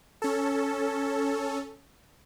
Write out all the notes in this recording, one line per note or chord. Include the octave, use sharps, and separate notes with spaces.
C#4 A4